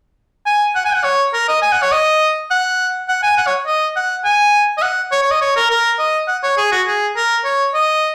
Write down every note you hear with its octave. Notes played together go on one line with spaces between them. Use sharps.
G#5
F#5
G#5
F#5
C#5
A#4
D#5
G#5
F#5
C#5
D#5
F#5
F#5
G#5
F#5
C#5
D#5
F#5
G#5
D#5
F#5
C#5
C#5
D#5
C#5
A#4
A#4
D#5
F#5
C#5
G#4
F#4
G#4
A#4
C#5
D#5